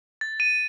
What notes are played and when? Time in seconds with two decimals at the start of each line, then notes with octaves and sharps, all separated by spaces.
0.21 A6
0.40 D#7